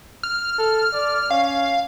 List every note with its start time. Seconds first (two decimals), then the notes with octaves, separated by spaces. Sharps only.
0.23 F6
0.58 A4
0.93 D5
1.31 C#4 F5